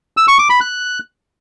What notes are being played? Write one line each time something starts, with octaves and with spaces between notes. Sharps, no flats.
E6
C#6
D6
B5
F#6